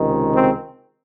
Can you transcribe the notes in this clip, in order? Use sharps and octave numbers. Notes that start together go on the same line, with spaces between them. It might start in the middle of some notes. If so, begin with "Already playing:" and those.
Already playing: C#2 C3 D#3 G#3
C4